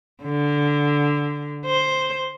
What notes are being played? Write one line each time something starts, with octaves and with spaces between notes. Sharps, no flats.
D3
C5